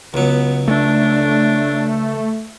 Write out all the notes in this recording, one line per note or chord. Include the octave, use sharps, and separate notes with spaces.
C#2 F#3 B3
A3 D4